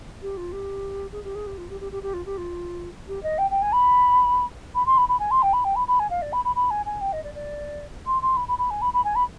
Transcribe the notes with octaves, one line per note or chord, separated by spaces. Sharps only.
G4
F4
G4
G#4
G4
G#4
G4
F4
G4
G4
G4
G4
F4
G4
F4
G4
D#5
G5
G5
G#5
B5
B5
C6
B5
B5
G#5
C6
G5
B5
G5
B5
B5
G#5
F5
D5
B5
B5
B5
G#5
G#5
G5
D#5
D5
D5
C6
C6
B5
B5
B5
G#5
B5
B5
G#5
B5